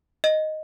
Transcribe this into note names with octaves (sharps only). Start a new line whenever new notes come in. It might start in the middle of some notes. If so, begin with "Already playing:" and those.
D#5